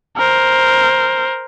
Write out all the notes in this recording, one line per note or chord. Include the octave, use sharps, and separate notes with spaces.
A#4 C5